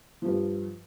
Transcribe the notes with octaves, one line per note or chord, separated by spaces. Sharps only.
G2 F3